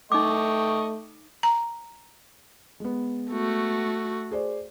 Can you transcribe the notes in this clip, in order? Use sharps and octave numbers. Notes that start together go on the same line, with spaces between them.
A3 D#4 D#5 G5 C#6 D6
A#5
G#3 B3
A3 F#4
G#4 C5 D5